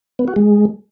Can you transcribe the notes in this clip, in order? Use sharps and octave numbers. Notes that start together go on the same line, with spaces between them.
B3
F#4
G#3